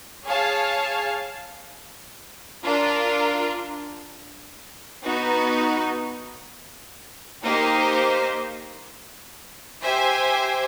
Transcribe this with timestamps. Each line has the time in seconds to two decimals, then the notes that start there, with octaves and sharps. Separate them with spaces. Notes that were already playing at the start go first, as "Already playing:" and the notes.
0.25 G#4 C#5 F5 A5
2.64 D4 F4 A#4
5.04 B3 D#4 F#4
7.42 A#3 D#4 G4 C5 D#5
9.81 G4 C5 E5 G#5